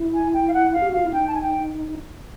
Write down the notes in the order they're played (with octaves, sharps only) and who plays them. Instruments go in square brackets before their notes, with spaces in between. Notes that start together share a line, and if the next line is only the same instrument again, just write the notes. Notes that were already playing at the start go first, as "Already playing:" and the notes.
Already playing: [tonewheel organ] E4
[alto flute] G#5
G5
F5
F#5
F5
[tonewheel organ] G4
F#4
[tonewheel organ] F4 [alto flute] F5
[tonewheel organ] E4
[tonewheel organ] D#4 [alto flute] G5
[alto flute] A5
G#5
G5